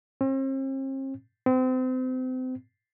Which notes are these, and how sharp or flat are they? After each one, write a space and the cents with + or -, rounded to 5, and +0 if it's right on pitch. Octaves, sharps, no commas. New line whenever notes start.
C4 +45
C4 -30